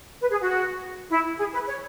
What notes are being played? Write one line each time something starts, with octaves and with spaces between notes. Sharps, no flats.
B4
G#4
F#4
E4
G#4
B4
C#5